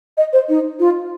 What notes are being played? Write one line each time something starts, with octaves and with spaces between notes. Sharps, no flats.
D#5
C5
D#4
F4